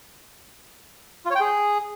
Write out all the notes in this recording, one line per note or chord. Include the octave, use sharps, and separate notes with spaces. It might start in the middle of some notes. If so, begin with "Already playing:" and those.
F4
C#5
G5
G#4